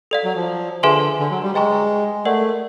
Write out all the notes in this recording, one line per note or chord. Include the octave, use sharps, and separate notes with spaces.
A4 D5 F5
F#3
F3
D3 G#4 B4 E5 G#5 C6
D3
F#3
G3
G#3 B4 D#5 G5 A#5 C#6
A3 A#4 D5 F#5